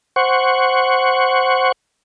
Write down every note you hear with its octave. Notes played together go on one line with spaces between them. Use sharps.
C5 F#5 C#6